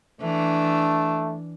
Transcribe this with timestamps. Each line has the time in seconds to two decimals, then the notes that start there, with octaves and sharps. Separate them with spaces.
0.21 E3 A3 D4